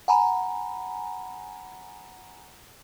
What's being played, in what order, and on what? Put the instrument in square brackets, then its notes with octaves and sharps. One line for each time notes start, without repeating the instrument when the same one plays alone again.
[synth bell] F#5 G#5 A#5 B5